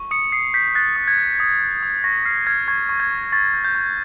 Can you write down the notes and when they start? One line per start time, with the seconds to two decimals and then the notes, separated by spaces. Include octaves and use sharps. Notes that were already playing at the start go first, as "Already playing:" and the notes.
Already playing: C#6
0.11 D#6 C#7
0.32 D#6 C7
0.54 G6 B6
0.75 F#6 A6
0.96 D#6
1.08 G#6
1.18 F#6
1.40 D#6
1.61 G6
1.83 D#6
2.04 C#6 A#6
2.25 F6 C7
2.47 F6 G#6
2.68 C#6 G#6
2.89 C#6
3.00 G#6
3.11 C#6
3.32 C#6 A6
3.54 G6
3.65 G6
3.75 C#6